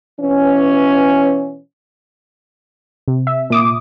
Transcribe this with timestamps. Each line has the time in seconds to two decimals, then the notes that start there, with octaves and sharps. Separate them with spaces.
0.20 B2 E3 C#4
3.08 C3
3.27 E5
3.50 A#2 D6 D#6